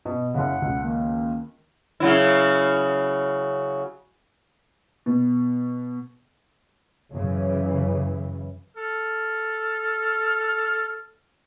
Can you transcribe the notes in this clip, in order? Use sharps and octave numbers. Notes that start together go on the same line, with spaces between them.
B2
F#1 C#3 F#5
C#2
D#3 A#3
C#3 F#3 E4
B2
F#2 C#3 E3
A4 F6